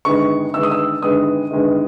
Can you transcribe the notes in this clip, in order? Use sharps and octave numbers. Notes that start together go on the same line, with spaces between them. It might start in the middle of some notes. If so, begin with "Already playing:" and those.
G1 G2 D#3 G#3 B3 C#6
G1 G2 D#3 G#3 B3 E6
D#6
E6
G1 G2 D#3 G#3 B3 D#6
G1 G2 D#3 G#3 B3